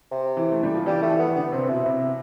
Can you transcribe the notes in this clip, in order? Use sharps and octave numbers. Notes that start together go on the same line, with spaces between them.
C3
E3
A3
G3
F3
E3 G3
A3
E3
B3
D3 B3
C3 C4
B2 E4
C3